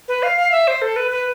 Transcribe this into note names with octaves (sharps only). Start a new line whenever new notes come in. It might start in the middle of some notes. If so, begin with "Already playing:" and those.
B4
F5
F5
E5
C5
A4
B4
B4